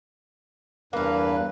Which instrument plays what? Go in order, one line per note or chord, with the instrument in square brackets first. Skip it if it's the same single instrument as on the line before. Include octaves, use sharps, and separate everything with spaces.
[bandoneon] E2 G2 B4 [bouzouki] A#3 F5